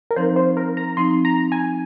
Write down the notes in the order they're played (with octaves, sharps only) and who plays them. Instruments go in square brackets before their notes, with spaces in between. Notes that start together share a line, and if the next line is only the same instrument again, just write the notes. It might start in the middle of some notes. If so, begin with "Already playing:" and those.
[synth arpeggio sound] A#4
[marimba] F3 C4 D#4 [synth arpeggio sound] C5
[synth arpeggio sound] C5
A#4
A#5
[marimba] F3 C4 D#4 [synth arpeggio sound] C6
[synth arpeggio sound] A#5
G#5